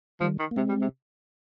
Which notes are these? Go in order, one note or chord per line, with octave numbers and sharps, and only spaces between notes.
D#3 F3 G3
D#3
A#3
C3 G#3 C4
G3
C3